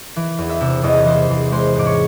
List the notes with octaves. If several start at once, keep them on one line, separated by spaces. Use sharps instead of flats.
E3
E2
E5 E6
C3
E2 D#5 D#6
E3 C5 C6
E2
G#3 C5 C6
G#2 D6
C#5 C#6